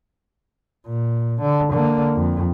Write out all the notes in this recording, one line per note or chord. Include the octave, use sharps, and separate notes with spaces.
A#2
D3
D3 A#3
F2